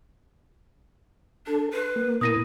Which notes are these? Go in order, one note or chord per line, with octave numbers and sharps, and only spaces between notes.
D4 A4
B4 C6
A#3
A#2 B3 E4 A#4 D#6 A#6 D#7